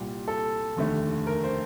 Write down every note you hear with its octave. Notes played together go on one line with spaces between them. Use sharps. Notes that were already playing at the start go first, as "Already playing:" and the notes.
Already playing: C2 A#2 G3
A4
F1 D#2 D3 A3
A#4
C5